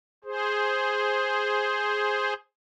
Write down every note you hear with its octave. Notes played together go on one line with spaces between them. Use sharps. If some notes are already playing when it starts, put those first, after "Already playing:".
G#4 C5